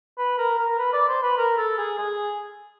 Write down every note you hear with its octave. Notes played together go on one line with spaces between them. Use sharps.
B4
A#4
A#4
B4
D5
C5
B4
A#4
A4
G#4
G#4